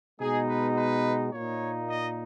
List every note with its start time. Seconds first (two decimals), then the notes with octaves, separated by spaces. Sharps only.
0.20 B2 G#3 B3 D#4 G#4
0.48 B4
0.76 B4
1.32 A#2 A#3 D#4 C#5
1.89 D#5